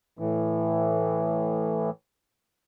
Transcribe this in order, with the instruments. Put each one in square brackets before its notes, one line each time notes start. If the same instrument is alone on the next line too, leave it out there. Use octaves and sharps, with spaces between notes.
[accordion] A2 E3